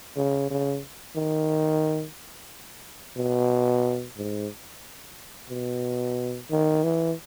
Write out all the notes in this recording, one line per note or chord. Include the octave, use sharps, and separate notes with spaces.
C#3
C#3
D#3
B2
G#2
B2
D#3
E3